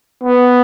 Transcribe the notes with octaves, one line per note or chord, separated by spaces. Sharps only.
B3